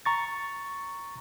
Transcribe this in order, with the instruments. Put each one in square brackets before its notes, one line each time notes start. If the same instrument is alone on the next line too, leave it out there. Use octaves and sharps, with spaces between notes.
[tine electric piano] A#5 C#6 A6